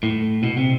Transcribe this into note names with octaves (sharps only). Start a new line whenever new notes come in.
A2
B2
C3